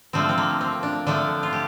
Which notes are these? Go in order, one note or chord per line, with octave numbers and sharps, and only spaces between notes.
D3 F3 A3 C4
C4
A#3
C4
D4
D3 F3 A3 D4
F4
G4